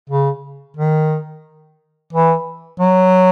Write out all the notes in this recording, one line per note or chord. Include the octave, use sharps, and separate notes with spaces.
C#3
D#3
E3
F#3